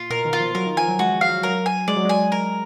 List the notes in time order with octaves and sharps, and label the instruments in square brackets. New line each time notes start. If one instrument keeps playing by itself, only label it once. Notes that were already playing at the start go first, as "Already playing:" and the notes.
Already playing: [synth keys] A#2 [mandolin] F4
[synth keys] B2 [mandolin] A#4
[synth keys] D#3
[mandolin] F4
[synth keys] F3
[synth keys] F#3 [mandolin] A#4
[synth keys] D#3
[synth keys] F3 [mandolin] G#5
[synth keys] F#3
[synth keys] G#3 [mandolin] F#4
[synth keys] F#3 [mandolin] F5
[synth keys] F#3 [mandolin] A#4
[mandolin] G#5
[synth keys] G#3 [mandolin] D5
[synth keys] F#3
[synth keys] G#3 [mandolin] G#5
[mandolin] A#4